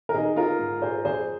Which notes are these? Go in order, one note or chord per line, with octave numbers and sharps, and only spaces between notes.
A#4
D#3 D#4 G#4
F4 A#4
G#2
G#4 C5
F2 G#4 C5